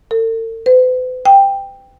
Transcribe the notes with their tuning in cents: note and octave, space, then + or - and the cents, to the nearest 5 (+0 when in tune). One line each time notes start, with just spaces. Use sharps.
A4 +45
B4 +45
G5 +10